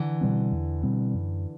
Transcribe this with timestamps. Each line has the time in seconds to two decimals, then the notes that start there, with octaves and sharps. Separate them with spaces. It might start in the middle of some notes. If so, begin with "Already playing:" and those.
Already playing: D3 E3
0.21 B2 G3 C4
0.52 E2
0.83 B2 G3 C4
1.14 F#2